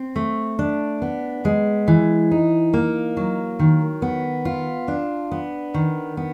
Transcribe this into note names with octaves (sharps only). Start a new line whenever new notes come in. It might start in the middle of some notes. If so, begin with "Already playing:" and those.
Already playing: C4
A3
D4
B3
G#3
E3
D#4
A#3
F#3
D#3
B3
F4
D4
B3
D#3
B3